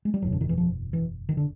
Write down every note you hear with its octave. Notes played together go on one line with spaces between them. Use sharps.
G#3
G3
F#1 E2 B2 F#3
D3
D#3
E3
F3
E3
D#3
D3